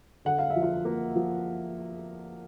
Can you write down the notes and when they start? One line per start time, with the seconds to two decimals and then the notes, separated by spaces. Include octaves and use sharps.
0.25 D3 F#5
0.38 F5
0.50 E5
0.56 F3
0.62 F4 F5
0.85 A#3
1.16 F3